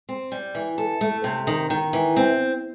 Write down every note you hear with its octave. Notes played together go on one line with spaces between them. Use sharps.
C4
G3
E3
A4
A3
C3
D#3
D#3
E3
C4